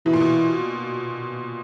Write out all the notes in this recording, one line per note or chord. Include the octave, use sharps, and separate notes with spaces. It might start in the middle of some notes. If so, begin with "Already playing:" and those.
B2 E3
A#2
B2